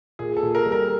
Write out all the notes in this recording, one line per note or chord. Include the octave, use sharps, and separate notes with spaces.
A#2 G#4
A4
A#2
A#4
G3
A#4